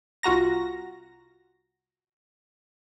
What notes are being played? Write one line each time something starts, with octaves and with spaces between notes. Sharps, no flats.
C2 F4 F#4 A#5 A#6